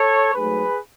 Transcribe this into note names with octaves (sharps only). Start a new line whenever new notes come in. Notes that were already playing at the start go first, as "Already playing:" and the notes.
Already playing: A4 C#5
G#2 F#3 A3 G#4 B4